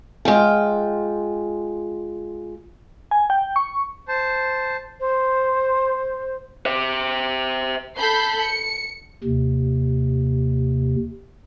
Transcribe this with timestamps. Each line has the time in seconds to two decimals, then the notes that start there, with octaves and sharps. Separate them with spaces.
0.25 G#3 F4 G5
3.11 G#5
3.30 G5
3.56 C#6
4.08 C5 A5
5.00 C5
6.65 C5 E5
7.97 A4 B5 G6 C7
8.41 C#7
9.24 D#2 C3